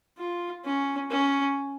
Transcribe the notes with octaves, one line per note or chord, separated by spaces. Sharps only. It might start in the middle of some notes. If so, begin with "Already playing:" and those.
F4
C#4
C#4